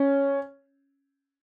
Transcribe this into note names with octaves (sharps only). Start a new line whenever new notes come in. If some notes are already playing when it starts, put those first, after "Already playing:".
Already playing: C#4